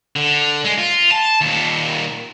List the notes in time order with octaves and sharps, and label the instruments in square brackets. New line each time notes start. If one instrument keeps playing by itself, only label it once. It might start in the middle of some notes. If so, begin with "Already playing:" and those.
[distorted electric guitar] D3
G#3
F4
A5
D#2 A#2